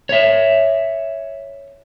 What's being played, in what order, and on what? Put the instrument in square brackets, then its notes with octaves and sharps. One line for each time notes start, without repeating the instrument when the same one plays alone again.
[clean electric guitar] C#5 E5